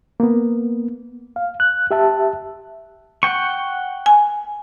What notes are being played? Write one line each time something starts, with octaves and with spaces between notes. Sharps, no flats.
A#3 B3
F5
F#6
G4 E5 A5
F#5 G5 C#6
G#5